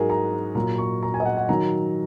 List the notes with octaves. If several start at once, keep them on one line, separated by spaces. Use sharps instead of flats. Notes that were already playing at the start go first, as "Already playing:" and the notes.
Already playing: G#2 F#3 F#4 G#4 A#4
A#5
A#2 F#3 A#5
C#6
A#5
G#5
D#5
F#5
F#5
D#3 F#3 A#5